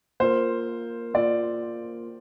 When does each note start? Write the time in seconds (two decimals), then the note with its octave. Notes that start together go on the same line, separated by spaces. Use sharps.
0.20 A#3 F4 A#4 C5
1.14 A#3 F4 A#4 D5